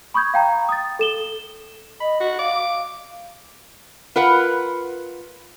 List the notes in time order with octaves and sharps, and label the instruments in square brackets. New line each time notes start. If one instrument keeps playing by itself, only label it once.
[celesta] B5 C#6 D#6 G6 G#6
F5 G5 A#5
D#6 A6
A4 E7 G7
[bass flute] D#5 [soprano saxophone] B5
[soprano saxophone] F#4
[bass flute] F5 [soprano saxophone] D6
[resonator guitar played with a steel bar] F4 A#4 B4 F#5